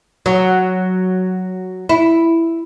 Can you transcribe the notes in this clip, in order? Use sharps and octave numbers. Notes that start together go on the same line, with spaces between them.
F#3
E4